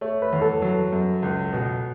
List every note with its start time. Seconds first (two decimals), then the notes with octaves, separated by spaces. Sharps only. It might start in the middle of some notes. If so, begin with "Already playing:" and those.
0.01 A3 C#5
0.22 B4
0.32 E2
0.42 A4
0.62 F#3
0.92 F#2
1.22 C#2
1.53 B2